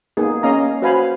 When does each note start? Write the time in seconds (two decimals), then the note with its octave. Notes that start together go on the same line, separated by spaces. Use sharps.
0.17 A#3 B3 D#4 G#4
0.43 A#3 C#4 D#5 F5 A#5
0.82 F#4 B4 C5 F5 G#5 B5